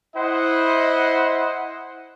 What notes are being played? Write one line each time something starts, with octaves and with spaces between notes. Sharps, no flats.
E4 C5 D#5 F#5